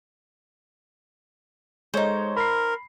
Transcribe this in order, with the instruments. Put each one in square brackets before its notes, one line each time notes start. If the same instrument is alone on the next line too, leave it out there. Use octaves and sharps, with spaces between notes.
[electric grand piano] G#3 A4 C#5 [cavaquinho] D#4 C5
[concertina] A#4 [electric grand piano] B5 C7